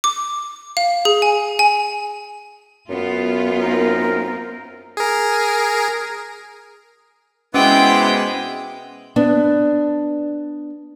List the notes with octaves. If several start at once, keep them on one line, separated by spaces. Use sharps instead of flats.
D6
F5
G#4
G#5
G#5
F#2 B3 F4
C4 D#4 A#4
G#4 A#4
B2 G#3 B3 C#4 E4 C5 G5 D6
B3 D4